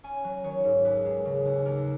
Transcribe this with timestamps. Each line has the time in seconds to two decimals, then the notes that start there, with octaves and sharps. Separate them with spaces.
0.04 C#4 G#5
0.24 F#3
0.44 D#3 C#5
0.65 G#2
0.85 D#2 B4
1.05 G#3
1.25 C#3
1.46 D#2
1.65 D#2 A#4